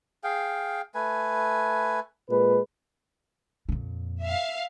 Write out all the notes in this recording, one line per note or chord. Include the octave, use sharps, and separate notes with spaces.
G#4 F5 G5
A3 B4 G#5
A#2 G#3 B4
F2 A#2
E5 F5